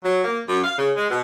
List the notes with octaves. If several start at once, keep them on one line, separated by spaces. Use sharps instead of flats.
F#3
A#3
F#2
F5
C#3
G#3
B2